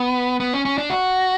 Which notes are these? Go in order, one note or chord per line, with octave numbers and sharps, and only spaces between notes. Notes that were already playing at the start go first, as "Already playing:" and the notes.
Already playing: B3
B3
C#4
C#4
D4
F#4